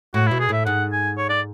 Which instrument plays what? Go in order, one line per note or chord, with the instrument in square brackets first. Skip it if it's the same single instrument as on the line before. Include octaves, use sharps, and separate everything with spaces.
[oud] A2 [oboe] F#4
[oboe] E4
[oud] B2
[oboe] G#4
[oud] A2 [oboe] E5
[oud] G#2 [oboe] F#5
[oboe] G#5
C#5
D5